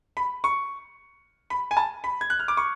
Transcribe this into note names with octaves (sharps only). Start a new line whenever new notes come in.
B5
C#6
B5
G#5
A5
B5
G#6
F#6
F6
D6
C#6